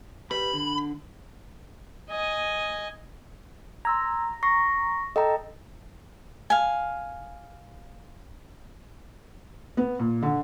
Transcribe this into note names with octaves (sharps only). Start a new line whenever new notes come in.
G4 B4 B5
D3
D#5 G#5
A#5 C6 E6 G#6
C#6 A#6 C7
A4 D#5 G5 A#5
F5 G#5
B3
A#2
D3